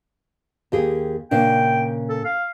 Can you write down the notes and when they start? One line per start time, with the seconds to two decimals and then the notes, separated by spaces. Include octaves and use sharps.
0.72 D#2 G4 G#4
1.31 A#2 C#3 D4 G5
2.09 A4
2.25 F5